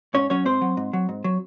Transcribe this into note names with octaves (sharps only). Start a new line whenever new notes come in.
G#2 C#4 C#5
F#3 C#4 C#5
G#2 C4 C5
F#3
G#2
F#3
G#2
F#3